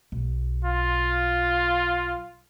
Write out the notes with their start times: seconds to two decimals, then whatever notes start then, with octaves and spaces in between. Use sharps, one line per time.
0.12 B1
0.65 F4